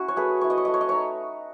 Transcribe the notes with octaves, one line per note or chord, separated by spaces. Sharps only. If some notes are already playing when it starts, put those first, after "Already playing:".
Already playing: C#4 E4 F#4
C#5
A3 G#4 B4
C#4 E4 C#5
D#5
C#5
A3 D#5
C#5
D#5
D#4 C#5